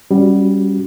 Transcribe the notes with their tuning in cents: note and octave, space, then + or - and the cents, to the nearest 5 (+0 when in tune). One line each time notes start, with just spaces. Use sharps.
G3 +0 C#4 +0 F#4 +5